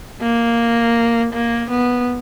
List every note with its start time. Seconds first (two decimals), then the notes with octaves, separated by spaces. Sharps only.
0.22 A#3
1.33 A#3
1.70 B3